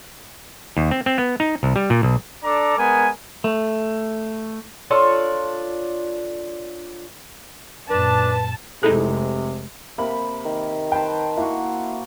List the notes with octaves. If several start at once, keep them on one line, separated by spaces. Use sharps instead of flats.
D#2
C4
C4
B3
D#4
C2
G3
A#2
B1
D4 A4 D5 A#5 D6
G#3 B3 A#4 G#5
A3
D4 F4 A4 C#5
F#2 A#2 D4 B4 A5
F1 C3 G#3 D#4 E4 G#4 A4
C3 A#3 B5
D#3
B4 C5 G5 A5
A#3 E4 F#4